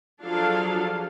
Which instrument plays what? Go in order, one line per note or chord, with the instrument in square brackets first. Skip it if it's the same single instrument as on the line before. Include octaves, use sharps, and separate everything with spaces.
[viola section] F3 F#3 D4 G#4 A4 F5